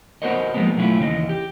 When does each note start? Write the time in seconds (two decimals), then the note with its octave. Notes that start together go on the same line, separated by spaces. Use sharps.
0.22 B3 F#4 A#4 C5 C#5 D#5
0.54 F3 F#3 G#3 A#3 B3
0.77 B2 F#3 A3 C#4 E4 F4
0.99 D#2 C#3 E3 F#4 D#5
1.29 G4